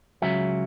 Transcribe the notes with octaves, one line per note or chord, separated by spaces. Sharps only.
C#2 C#3 F#3 E5